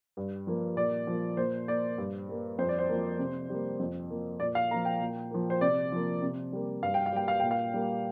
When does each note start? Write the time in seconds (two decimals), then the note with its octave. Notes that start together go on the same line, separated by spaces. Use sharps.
0.17 G2
0.47 F3 A#3
0.77 A#2 D5
1.07 F3 A#3
1.37 A#2 C5
1.68 A#3 D5
1.98 G2
2.29 G3 A#3
2.59 F2 C5
2.69 D5
2.79 C5
2.89 F3 A#3
3.19 C3
3.49 G3 A#3
3.80 F2
4.10 F3 A#3
4.40 A#2 D5
4.55 F5
4.71 A#3 A#5
4.74 F3
4.85 G5
5.01 A#2
5.31 F3 A#3
5.50 C5
5.61 C3 D5
5.92 F3 A#3
6.22 C3
6.53 G3 A#3
6.82 G2 F5
6.94 G5
7.06 F5
7.12 G3 A#3 G5
7.28 F5
7.40 A#2 G5
7.51 F5
7.74 G3 A#3